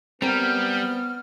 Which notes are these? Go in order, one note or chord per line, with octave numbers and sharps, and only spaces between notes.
G3 B3 C4 A#4 F6